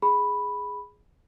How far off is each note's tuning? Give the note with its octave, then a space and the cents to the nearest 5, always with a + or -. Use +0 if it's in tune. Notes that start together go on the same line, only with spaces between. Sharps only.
G#4 +0 B5 +0